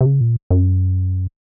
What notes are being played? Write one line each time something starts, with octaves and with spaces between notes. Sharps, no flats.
C3
C#3
A#2
F#2